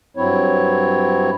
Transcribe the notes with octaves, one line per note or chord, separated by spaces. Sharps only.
G2 F#3 C4 E4 C#5